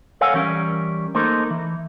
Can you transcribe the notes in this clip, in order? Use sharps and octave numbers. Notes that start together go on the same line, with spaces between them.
A4 A#4 C#5 F5 F#5 G#5
E3 G3 C#4 A#4
A3 A#3 D#4 A4 A#4 C5
E3